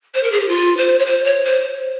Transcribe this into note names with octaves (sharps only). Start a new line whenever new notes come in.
C5
A#4
G#4
G4
F4
C5
C#5
C5
C#5
C5